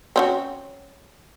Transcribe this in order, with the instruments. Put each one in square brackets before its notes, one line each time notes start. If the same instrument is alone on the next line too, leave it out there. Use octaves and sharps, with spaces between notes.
[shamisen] C4 C#4 F#4